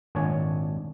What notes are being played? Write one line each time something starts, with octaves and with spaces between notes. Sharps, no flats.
G#1 A#2 D4 C#5 G#5 A5